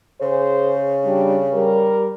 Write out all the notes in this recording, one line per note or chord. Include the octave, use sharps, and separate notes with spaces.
C#3 G#4 C5
G3 D4
G3 A#4